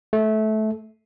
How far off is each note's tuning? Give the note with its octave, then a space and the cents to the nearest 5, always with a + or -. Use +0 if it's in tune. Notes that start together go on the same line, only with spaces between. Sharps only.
A3 -20